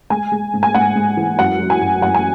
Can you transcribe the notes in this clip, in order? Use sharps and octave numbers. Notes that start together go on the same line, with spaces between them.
G#3 G#5
G#3
G#2
G#5
G#2 F#5
G#2
E3
F#2 F#5
F#3
G#5
F#2
F#2 F#5
G#5